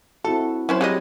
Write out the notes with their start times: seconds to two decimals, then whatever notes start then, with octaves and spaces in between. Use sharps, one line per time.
0.24 C4 E4 F#4 A4
0.41 E4
0.69 F#3 C#4 E4 C5 C#5
0.81 G3 G#3 C4 D#5